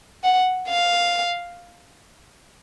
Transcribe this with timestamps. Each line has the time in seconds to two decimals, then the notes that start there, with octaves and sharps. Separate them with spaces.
0.24 F#5
0.69 F5